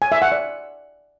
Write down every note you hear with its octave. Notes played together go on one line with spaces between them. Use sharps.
G#5
E5
F#5
D5